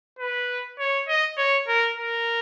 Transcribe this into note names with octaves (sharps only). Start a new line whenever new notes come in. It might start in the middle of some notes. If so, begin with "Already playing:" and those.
B4
C#5
D#5
C#5
A#4
A#4